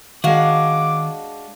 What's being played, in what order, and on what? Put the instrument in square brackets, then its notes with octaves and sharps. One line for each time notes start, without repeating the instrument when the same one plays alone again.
[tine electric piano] D#3 [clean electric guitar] G#3 F#4 [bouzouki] D4 F5 [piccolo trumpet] D6